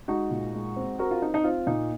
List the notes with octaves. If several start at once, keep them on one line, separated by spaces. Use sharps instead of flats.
G#3 D#4 F#4
A#2
G#3
C4
C4 F#4 A#4
F4
C4 D#4
D#4
C4 F4
A#2 D#4